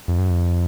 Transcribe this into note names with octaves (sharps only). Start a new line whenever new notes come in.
F2
F#2
F2